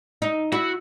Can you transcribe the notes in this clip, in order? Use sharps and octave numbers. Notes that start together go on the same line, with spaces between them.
D#4
E4 F#4